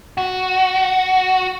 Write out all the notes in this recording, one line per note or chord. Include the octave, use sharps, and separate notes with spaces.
F#4